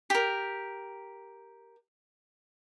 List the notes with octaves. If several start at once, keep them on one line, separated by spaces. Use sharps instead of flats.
G4 A#4